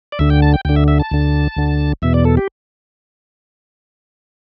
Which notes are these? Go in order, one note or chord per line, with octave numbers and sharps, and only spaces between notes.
D5
D2 D3 E5
G5
A5
G5
D2 D3 G5
E5
E5
A5
D2 D3
D2 D3
E2 B2 E5
D5
A4
G4